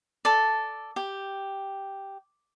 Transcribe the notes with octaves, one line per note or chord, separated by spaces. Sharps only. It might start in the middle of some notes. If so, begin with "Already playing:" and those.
A4 D5
G4